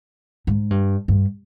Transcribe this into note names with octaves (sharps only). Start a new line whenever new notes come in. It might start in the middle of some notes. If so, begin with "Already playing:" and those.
G#2
G2
G2